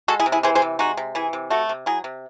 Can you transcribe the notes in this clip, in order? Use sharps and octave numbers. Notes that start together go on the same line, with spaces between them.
G#3 F#4 A4
E4 G#4
C3
E4 G#4
E3 G#4 C5
G#4 C5
C3
G#3 D#4 F#4
C3
E3 E4 G#4
C3
A3 F#4 A4
C3
F#3 E4 G#4
C3